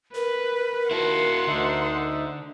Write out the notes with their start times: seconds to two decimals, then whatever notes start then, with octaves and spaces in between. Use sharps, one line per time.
0.15 A#4 B4
0.91 D#2 E4 F#4 F#5 A5 C6
1.47 D2 D3 D#4 E5